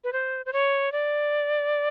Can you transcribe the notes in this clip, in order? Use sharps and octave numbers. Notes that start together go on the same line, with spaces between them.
B4
C5
C5
C#5
D5